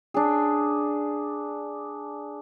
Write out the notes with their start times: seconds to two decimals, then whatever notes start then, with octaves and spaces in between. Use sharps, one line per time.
0.14 D4 G#4